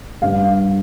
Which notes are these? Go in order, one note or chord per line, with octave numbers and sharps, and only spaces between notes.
G2 F5